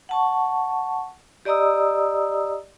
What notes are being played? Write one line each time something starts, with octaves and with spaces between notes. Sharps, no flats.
F#5 A5 C#6
G4 D5 D#5 A#5 D#6 E6